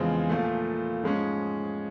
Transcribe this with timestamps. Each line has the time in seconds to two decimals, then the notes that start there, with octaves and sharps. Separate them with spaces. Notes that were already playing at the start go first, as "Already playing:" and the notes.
Already playing: E2 C#3 F3 G#3 C4
0.30 A#2 F3 A3
1.03 G#2 F3 G#3 C#4